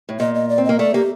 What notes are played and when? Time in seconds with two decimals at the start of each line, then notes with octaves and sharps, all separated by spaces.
0.09 A2
0.20 A#2 D#5
0.35 D#5
0.49 D5
0.58 C4
0.65 A#3 D#5
0.79 A3 D5
0.94 A#3 G4